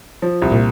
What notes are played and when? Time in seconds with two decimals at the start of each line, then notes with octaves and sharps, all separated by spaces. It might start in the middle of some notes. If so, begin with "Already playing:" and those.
0.22 F3
0.42 C2
0.52 A#2